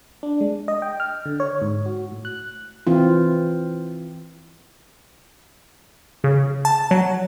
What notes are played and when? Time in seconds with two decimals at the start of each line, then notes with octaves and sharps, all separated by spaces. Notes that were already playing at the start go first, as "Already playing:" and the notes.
0.23 D4
0.41 G#3
0.68 D#5
0.82 G5
1.00 F6
1.25 D3
1.40 C#5
1.62 G#2
1.86 F#4
2.12 A2
2.25 F#6
2.87 E3 C4 F4
6.24 C#3
6.65 A5
6.91 F#3